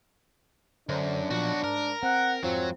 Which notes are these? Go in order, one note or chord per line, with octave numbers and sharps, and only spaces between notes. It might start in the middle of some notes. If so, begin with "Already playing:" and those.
F#2 D3 D4 C5
B1 A#2 F3 F#3 F#4
G#2 A#4
C4 F#5
F2 G#2 F#3 C4 F4